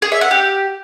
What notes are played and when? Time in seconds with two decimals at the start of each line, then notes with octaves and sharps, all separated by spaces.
0.02 G#4
0.12 E5
0.21 F#5
0.31 G4